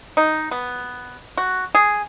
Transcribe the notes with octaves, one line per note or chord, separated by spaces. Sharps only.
D#4
B3
F#4
G#4